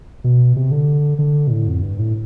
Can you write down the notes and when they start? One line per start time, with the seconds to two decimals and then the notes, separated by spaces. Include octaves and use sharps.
0.24 B2
0.56 C3
0.71 D3
1.19 D3
1.47 B2
1.51 A2
1.67 F2
1.82 G2
1.99 A2